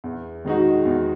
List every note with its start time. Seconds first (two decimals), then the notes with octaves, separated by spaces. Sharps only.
0.04 E2
0.45 D#3 G#3 D#4 F#4
0.85 E2